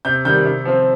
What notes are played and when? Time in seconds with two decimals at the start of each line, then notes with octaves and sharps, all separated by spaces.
0.05 C3 G6
0.25 D#3 G3 G6
0.45 C3
0.65 F3 C4